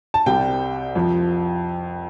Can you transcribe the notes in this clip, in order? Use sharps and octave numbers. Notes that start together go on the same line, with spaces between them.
A5
C2 C3 G3 G5
F2 F3